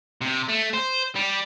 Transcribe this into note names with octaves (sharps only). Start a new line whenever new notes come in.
C3
A3
C5
G3